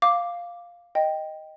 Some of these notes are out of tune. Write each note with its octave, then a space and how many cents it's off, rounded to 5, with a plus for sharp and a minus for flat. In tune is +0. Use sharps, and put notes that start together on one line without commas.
F5 +0 D6 +0
D#5 +0 G5 +0